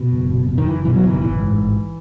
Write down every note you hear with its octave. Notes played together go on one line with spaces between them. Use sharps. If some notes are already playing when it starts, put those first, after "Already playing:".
Already playing: B2
F#1
B2
B2
D#3
F#1 E3
B2 E3
F#3
F#1 E3
D#3
A1 E3
G#2
A1